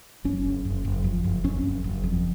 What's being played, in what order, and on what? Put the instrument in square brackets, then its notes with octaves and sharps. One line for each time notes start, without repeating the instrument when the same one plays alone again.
[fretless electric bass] F#1 C#4
F#1
F#1
F#1
F2
F#1
F2 C#4
F#1
F#1
F2